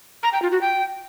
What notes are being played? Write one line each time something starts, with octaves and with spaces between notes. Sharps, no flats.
A#5
G5
F4
F#4
G5